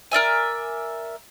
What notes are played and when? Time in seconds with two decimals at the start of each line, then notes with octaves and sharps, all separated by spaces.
0.12 A#4 D5 E5 G#5